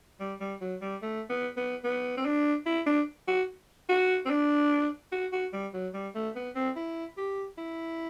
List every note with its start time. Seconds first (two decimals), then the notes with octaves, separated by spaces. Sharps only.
0.20 G3
0.40 G3
0.61 F#3
0.82 G3
1.02 A3
1.30 B3
1.57 B3
1.84 B3
2.17 C4
2.25 D4
2.66 E4
2.87 D4
3.28 F#4
3.89 F#4
4.26 C4
4.30 D4
5.12 F#4
5.33 F#4
5.53 G3
5.74 F#3
5.94 G3
6.15 A3
6.36 B3
6.55 C4
6.76 E4
7.17 G4
7.58 E4